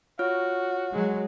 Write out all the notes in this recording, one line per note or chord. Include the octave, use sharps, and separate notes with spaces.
F4 F#4 C#5 F6
F#3 G#3